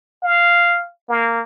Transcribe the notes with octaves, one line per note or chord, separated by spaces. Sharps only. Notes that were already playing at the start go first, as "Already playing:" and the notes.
F5
A#3